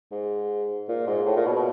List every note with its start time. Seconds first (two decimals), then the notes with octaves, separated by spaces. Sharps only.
0.12 G#2
0.89 A#2
1.07 G#2
1.26 A2
1.37 A#2
1.46 B2
1.56 B2